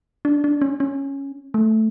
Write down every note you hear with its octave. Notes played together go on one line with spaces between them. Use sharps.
D4
D4
C#4
C#4
A3